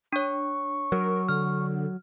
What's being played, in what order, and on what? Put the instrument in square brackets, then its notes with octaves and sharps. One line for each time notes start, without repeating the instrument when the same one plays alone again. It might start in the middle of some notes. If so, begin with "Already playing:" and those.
[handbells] D4 C#5 [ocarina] C#6
[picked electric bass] F#3 [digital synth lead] A#4
[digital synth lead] D3 [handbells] F6